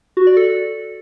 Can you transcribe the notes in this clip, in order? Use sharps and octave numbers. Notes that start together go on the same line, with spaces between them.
F#4
D5
A4